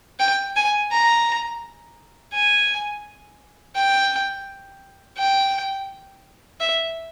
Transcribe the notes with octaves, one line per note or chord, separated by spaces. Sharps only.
G5
G#5
A#5
G#5
G5
G5
E5